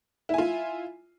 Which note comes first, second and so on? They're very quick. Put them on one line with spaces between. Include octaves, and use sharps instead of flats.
E4 G#5 F4